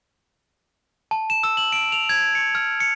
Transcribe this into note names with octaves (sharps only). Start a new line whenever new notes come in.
A5
E7
E6
F#7
D7
F7
G#6
C#7
F6
C#7